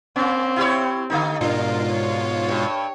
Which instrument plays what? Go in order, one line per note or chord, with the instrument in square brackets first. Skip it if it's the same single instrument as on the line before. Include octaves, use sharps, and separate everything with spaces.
[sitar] A#3 C#4 [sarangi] C4
[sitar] E4 G4 C#5
D3 A3 D#4
[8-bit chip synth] G#2 B2 F4 [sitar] D4 [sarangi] A#4
[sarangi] C#5
[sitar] G2